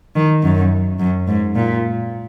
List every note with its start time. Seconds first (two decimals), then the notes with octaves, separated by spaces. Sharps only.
0.15 D#3
0.43 F#2
0.99 F#2
1.27 G#2
1.55 A#2